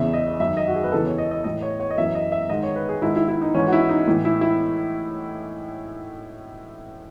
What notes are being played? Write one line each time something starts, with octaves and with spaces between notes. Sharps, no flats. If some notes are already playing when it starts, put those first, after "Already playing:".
Already playing: E2 C#3 E3 E5
D#5
F#2 D#3 E5
D#5
F#4
G#4
B4
E2 C#3 E3 A4
C#5
D#5
D#5
A2 E3 D#5
C#5
C#5
D#5
F#2 E3 E5
D#5
E5
G#2 D#3 D#5
C#5
B4
G#4
G#2 D#3 E4
E4
E4
D#4
G#2 E3 C#4
F#4
E4
D#4
A2 E3
E4
E4